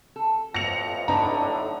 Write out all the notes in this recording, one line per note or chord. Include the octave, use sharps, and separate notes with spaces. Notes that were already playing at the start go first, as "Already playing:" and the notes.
A4
A1 F2 A#6 C#7 F7
B1 A2 D3 D4 D#4 B4 A#5